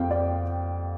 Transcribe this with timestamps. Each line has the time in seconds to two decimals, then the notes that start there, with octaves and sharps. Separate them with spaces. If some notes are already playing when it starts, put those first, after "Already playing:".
Already playing: F2 F3 C4 F5 G5
0.11 D5